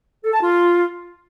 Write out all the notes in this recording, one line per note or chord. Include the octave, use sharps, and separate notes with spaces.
A4
A5
F4